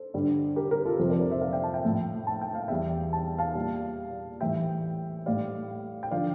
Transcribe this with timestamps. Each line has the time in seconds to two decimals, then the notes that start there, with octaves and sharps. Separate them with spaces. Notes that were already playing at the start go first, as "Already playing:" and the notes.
Already playing: A4 C5
0.14 G2 D3 G3
0.56 G4 A#4
0.71 G4 A#4
0.85 F4 A4
0.99 F2 C3 F3 A4 C5
1.10 A#4 D5
1.20 A#4 D5
1.31 C5 E5
1.41 D5 F5
1.53 E5 G5
1.63 F5 A5
1.74 E5 G5
1.85 A2 F3
2.27 A5
2.41 G5
2.55 F5
2.68 E2 E3 G3 E5 G5
3.13 A5
3.38 F5 A5
3.55 A#2 G3
4.41 A2 E3 G3 E5 G5
5.26 A2 G3 D5 F5
6.03 G5
6.11 D3 F3 D5 F5